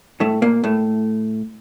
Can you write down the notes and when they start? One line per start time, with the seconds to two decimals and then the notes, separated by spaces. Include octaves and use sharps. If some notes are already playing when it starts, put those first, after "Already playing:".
0.20 A2 A3
0.42 A#2 A#3
0.64 A2 A3